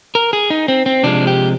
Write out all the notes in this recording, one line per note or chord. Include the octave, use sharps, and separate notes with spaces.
A#4
G#4
D#4
C4
C4
C3 F3 G#3 D4
G4